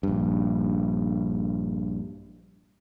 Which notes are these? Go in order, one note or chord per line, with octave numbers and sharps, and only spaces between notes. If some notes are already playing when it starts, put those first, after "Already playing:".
A#1 G2